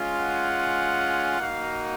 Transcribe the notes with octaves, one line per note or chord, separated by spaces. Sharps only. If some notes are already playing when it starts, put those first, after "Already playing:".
Already playing: G#3 C#4 F4
F#5
A#3 D#4 F#4 F5